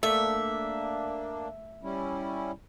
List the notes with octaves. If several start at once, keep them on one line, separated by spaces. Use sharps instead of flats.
A3 A#3 D4 E5
G3 C#4 E4